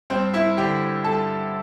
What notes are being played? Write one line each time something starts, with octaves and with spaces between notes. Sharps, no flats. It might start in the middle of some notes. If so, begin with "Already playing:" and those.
G2 C4 C5
E4 E5
D3 G4 G5
G2 A4 A5